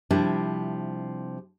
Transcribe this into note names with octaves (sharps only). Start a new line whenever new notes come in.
C3 F3 G3 D4 E4